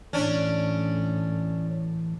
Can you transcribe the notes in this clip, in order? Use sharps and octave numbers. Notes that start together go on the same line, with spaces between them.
A2 E3 C#4 D4